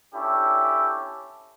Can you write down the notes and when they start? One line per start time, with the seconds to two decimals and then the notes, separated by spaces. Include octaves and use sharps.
0.14 C#4 D4 E4 G4 A4